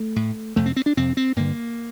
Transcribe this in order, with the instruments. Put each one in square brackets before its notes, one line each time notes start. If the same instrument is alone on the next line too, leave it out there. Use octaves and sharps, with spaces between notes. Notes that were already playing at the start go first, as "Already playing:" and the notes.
Already playing: [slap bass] A3
A2
F2 C3 A3
C4
C4
D4
F2 C3 C4
C4
G2 D3 A#3